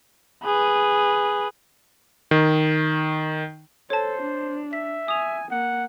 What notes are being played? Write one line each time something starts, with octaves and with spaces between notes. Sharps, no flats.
G#4 B4
D#3
A4 C5 C#5 A5
D4
E5 B6
G#5 D#6 F7
A#3 F#5